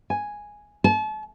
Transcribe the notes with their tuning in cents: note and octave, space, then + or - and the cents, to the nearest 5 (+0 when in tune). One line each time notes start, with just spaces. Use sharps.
G#5 +0
A5 -35